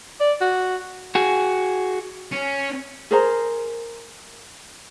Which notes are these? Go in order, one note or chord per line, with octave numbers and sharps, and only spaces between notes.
D5
F#4
F#4 G#4
C#4
G#4 A#4 C5 A#5